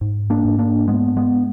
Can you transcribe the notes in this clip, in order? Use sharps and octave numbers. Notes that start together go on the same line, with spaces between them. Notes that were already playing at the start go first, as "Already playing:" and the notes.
G#2
A#3 D4
G#2
A#3 D4
G#2 G#3 B3
G#3 B3